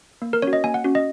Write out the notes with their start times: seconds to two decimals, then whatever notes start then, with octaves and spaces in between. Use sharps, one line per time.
0.22 A#3
0.33 A#4
0.42 C#4 F#4 C#5
0.53 D#5
0.64 A#3 G#5
0.74 F#5
0.84 C#4 F#4
0.95 D#5